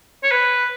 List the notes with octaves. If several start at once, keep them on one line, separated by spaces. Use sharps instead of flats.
C#5
B4